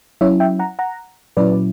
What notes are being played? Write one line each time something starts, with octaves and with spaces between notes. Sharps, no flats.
F#3 C#4 E4 C#5 E5
E5 G5
F#5 A#5
F#5 A#5
A#2 F#3 C#4 E4 B4 D5